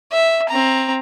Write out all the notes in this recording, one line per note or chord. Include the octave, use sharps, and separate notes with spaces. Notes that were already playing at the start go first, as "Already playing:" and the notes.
E5
C4 A#5